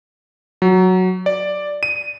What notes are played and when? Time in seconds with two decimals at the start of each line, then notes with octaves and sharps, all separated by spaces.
0.62 F#3
1.26 D5
1.83 D#7